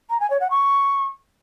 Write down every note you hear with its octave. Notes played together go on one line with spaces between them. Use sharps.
A#5
G#5
C#5
F#5
C#6